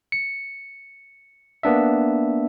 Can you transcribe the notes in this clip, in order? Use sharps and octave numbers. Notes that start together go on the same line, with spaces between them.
C#7
A#3 B3 D4 E5